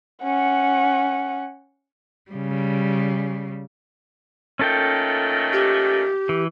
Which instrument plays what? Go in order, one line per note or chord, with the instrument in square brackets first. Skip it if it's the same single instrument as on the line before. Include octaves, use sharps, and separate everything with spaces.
[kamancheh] C#4 F#5
[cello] C#3 G3
[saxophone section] A#2 D#3 A3 [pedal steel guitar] C#4 A4 G5
[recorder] G4
[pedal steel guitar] E3